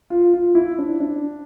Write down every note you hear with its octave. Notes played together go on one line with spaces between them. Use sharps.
F4
F4
E4
D4
D4